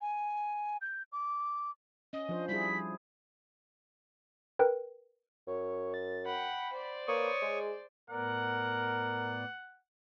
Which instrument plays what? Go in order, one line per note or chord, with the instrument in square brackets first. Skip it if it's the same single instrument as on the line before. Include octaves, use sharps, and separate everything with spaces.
[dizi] G#5
G6
D6
[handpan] C#4 [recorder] D#5
[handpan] F3 D4 C5
[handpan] G3 E4 G#4 [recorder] B6
[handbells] A#4 B4 G5
[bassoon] F#2 [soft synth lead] C#5
[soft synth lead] A6
[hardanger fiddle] F#5 G5 [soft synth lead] B5
[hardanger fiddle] C5 D5
[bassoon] A#3 [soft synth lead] B4 [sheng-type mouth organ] C#5 C#6 D#6
[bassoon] G#3 [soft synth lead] G#4
[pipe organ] A2 B3 D5 [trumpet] A#4 [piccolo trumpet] F#5